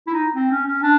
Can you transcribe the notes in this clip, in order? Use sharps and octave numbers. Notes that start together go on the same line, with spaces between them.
E4
D#4
C4
C#4
C#4
D4